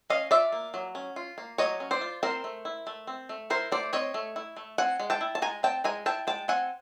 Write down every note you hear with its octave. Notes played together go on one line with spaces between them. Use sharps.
C#4 D#5 F5
F4 D5 E5
A#3
F#3
C#4
F4
A#3
F#3 C#5 D#5
C#4
C5 D5
F4
C4 A#4 C5
A3
E4
A3
C4
A3
E4 A#4 C5
A3 C5 D5
C4 C#5 D#5
A3
E4
A3
C4 F#5 G#5
G#3
G5 A5
E4
A5
G#3 G#5 A#5
C4 G5 A5
G#3 G#5 A#5
E4 G5 A5
G#3 G5 A5
C4 F#5 G#5